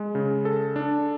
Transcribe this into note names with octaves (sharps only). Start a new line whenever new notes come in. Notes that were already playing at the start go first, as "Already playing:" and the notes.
Already playing: G#3
C#3
A4
D4